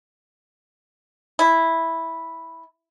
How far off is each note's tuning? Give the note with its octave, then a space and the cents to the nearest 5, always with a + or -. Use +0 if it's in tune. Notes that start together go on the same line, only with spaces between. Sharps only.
E4 -5